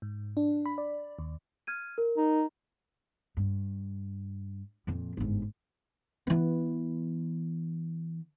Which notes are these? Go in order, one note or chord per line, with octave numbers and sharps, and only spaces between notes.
G#2
D4
B5
D5
D#2
F6 G#6 D#7
A#4
D#4
G2
F2 A#2
G1 G#2
E3 B3